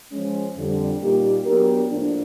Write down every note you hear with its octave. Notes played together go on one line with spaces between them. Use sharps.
F3 G#3 C#4
F2 D3 G3
A#2 G3 A#3 D#4 G4
F#3 B3 D4 G4 A#4
A2 F3 A#3 D4